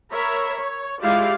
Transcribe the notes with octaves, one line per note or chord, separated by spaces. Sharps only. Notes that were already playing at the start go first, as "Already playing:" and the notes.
A#4 C#5 E5 B5
C#5
G#3 E4 F4 G4 D5 F5